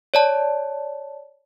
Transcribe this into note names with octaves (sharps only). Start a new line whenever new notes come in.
C#5 D5 A5